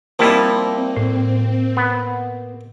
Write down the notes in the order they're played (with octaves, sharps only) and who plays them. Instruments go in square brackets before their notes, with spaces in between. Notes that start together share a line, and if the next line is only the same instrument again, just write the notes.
[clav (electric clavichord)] F3 G3 E4 [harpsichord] A#3 D#4 [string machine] C4
[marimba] A2
[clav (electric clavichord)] B3